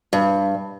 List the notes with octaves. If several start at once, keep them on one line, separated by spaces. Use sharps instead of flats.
G2